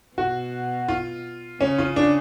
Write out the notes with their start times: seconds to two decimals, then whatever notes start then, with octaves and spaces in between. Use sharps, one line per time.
0.17 B2 F#4
0.88 F4
1.61 C#3 C#4
1.78 F4
1.96 D4